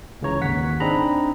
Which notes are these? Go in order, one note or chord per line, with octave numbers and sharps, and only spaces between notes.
C#2 C#3 E3 C#5 A#5
G#1 D#2 F#5 B6
C4 D4 D#4 G#4 A#5 B5